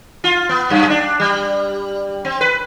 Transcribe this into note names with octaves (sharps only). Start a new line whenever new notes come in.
F4
B3
F#2
D4
G3
C4
B4